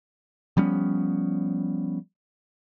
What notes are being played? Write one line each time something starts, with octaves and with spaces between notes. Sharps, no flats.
F3 G3 B3 C#4